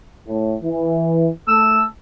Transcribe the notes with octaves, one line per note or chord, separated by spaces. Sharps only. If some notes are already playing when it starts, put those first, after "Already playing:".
A2
E3
A3 A5 E6